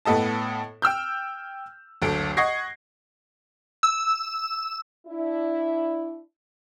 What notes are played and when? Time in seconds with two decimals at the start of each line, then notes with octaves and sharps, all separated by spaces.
0.05 A2 B3 A4 D#5 A5
0.82 G5 E6 F6 G6
2.02 F#1 D2 A4 D7
2.37 D#5 F#5 C#6 G#6 A#6 C7
3.83 E6
5.07 D4 E4